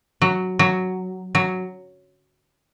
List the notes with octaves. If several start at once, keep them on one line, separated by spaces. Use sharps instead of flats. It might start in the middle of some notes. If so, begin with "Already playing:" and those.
F#3
F#3
F#3